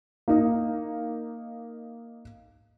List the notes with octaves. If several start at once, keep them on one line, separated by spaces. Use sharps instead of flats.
A#3 D#4